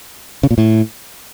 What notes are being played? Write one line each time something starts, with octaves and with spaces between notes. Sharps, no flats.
C#3
A#2
A2